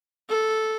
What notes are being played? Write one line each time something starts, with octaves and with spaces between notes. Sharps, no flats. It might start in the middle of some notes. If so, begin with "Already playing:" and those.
A4